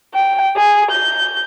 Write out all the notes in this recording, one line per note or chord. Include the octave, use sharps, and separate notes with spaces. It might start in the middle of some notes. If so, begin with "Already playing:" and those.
G5
G#4
G6